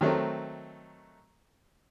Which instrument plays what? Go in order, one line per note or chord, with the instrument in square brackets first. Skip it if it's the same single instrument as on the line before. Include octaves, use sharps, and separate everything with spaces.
[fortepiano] D#3 F#3 A3 C4